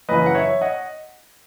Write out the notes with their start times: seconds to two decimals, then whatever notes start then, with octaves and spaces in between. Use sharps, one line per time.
0.09 F#2 C#3 E3 B4 D#5
0.26 F#5
0.35 C#5 E5
0.61 D#5 F#5